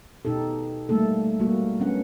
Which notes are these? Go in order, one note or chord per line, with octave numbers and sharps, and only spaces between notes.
B2 D#4 G4 A4
G3 A3 A#3 A4
G3 G#3 A#3 F#4
F#3 B3 C#4 D4 F#5